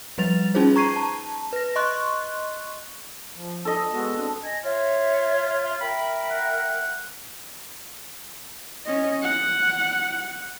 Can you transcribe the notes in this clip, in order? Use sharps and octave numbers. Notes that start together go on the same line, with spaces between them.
F3 G3 B4 A6 F7
C#4 D#4 F4 G#4 C5
A#5 C#6 G#6 C7 D#7
A5
B4 A#6
D#5 C6 C#6 F#6
F3
A4 D#5
G#3 B3 F#4
C4 D4
D#5 G#5
F4 C#5 E5
A#4 E5 G5 B5
F#5
C#4 D#5
F#5